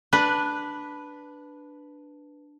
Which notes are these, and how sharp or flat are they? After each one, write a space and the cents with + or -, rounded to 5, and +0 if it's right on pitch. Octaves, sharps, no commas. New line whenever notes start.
D4 +0 B4 +0